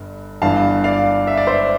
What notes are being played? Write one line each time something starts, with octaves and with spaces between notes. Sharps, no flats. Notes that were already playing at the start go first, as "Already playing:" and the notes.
Already playing: G1 G2
G1 G2 E3 F5 A5
D5 F5
E5
D5
C5 E5